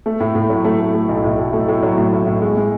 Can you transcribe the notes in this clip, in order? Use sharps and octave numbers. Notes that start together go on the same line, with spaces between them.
A3
A2
A2
F#3
A3
A3
A3
B1
A2
B1
A3
A2
F#3
A2
A2
A2
G#3
G#3